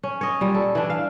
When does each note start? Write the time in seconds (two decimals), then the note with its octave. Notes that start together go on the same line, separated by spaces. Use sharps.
0.03 C#4
0.21 C#5 D#5
0.41 A#2 G3
0.55 A4
0.75 E3 D4
0.90 F5